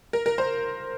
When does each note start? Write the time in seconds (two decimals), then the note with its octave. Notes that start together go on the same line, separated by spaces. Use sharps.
0.13 A#4
0.26 A#4
0.38 C5